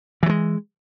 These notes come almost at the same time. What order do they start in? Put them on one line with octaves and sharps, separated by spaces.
E3 F#3 G#3